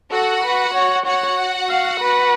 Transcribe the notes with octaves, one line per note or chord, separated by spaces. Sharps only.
F#4 A4 F#5
B4
C#5
F#4 C#5 F#5
F5
B4